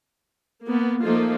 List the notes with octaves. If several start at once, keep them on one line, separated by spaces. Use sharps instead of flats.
A#3 B3
F3 A3 A#3 D#4 F4